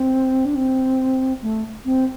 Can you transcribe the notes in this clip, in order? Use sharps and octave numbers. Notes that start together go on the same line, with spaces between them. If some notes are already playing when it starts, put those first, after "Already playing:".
Already playing: C4
D4
C4
A3
C4